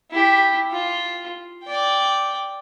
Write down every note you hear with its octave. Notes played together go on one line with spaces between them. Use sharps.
E4 G4
F4
D5 G5